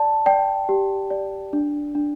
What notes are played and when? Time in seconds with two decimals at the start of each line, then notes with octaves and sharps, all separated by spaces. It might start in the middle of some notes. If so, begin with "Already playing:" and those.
Already playing: D5 A5
0.26 D5 G5
0.69 G4
1.10 D5
1.53 D4
1.95 D4